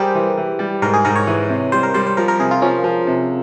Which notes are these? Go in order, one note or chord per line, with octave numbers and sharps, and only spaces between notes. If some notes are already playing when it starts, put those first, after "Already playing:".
Already playing: G3 G4 G#4 A#4 C5
E3
E3
G3
G#2 A#4
G#4
G#2 A#4
C#5
E3
C3
G3 C5
A#4
G3 C5
C5
F3 A#4
A#4
C3 G#4
F4
F3 C#4
F3
C3